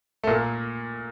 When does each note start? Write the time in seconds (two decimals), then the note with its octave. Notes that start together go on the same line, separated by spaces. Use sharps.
0.24 A3
0.27 A#2 A#3